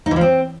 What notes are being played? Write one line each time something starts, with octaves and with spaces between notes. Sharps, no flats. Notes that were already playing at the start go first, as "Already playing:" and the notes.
D#4
E3
F3
C4